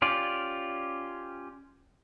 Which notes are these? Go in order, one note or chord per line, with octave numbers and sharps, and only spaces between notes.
C#4 F4 G4 D5